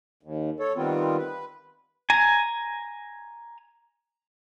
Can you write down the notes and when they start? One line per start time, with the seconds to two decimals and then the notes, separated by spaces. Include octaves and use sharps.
0.23 D#2
0.60 A4 C#5
0.77 D#3 G3 B3 C4 F4
1.18 B4
2.10 G#5 A#5